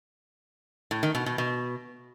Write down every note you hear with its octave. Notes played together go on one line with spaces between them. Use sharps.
A2
D#3
B2
B2
B2